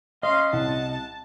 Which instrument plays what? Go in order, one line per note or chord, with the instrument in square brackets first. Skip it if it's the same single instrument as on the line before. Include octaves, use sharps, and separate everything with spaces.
[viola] C#4 C6 [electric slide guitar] D#5 [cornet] F5
[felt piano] C2 [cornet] F#5 [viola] A5